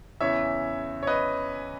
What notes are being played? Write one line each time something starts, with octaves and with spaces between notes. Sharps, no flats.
E2 C#3 E3 C#5 E5
C#5
B4 D#5